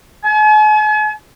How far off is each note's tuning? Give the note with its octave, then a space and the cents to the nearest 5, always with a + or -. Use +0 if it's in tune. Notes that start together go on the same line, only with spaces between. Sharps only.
G#5 +45